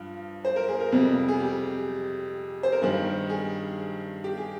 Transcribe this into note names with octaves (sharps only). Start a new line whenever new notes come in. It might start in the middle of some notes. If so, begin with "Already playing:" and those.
Already playing: G2 F3
C5
A#4
G#4
A#4
F2 C3 G3
G#4
G4
C5
A#4
G2 D#3 G3 G#4
G#4
G4
G#4